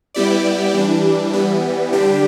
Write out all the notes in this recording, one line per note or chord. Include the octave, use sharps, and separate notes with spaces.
G3 B3 E4 G4 D5
E3 G3 D4
E3 G3 B3
D3 G3 D4 G4